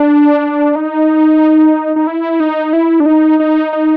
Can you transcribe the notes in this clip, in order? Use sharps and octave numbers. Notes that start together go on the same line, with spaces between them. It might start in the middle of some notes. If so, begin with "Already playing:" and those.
Already playing: D4
D#4
D#4
E4
D#4
E4
D4
D#4
D#4
D#4